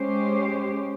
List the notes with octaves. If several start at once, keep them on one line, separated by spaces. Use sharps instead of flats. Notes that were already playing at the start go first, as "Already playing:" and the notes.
Already playing: G#3 C#4 G4 C5